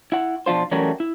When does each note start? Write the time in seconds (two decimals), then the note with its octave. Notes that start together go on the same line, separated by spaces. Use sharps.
0.12 E4 F#5
0.46 B2 F3 D4 F4 C5
0.71 E3 F#3 G3 A3 C#4 A#4
1.00 E4